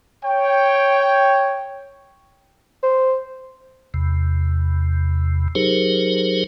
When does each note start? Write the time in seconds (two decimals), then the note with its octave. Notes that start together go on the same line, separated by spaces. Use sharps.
0.24 C#5 G5
2.83 C5
3.94 E2 C3
5.55 F#3 D#4 G4 G#4 A#4 C5